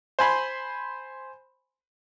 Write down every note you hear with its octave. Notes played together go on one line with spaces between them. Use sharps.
C5 G#5 B5 C6